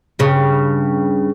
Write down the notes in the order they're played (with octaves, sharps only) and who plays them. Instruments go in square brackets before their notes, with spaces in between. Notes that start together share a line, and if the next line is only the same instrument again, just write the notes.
[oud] G2 C#3